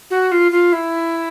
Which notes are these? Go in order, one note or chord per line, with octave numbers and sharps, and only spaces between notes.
F#4
F4
F4
E4